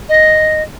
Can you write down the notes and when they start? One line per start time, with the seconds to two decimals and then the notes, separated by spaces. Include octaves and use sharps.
0.09 D#5